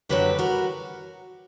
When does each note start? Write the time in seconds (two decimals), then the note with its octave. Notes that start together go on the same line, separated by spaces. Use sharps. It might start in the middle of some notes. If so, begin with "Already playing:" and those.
0.09 F#2 D3 F#3 G4 B4
0.39 F#4 A#4